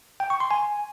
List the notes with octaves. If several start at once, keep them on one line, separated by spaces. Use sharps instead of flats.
G5
C#6
C6
G#5